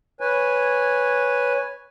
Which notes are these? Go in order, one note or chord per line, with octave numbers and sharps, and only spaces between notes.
B4 C#5 G#5